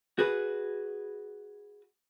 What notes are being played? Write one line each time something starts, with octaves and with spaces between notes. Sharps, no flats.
F#4 G#4 B4